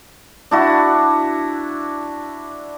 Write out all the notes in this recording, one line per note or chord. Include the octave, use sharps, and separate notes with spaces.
D4 E4 F#4